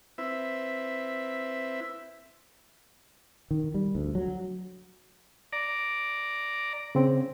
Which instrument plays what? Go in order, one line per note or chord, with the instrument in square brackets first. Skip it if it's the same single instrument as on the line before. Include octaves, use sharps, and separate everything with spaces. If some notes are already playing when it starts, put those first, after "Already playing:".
[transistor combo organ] C4 E4 B4 E5
[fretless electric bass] D#3
G3
D2
F#3
[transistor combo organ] D5 A#5
[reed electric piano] C#3 C4